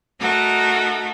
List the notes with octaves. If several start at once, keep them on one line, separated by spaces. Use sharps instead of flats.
A3 D#4 F#4 A4 A#4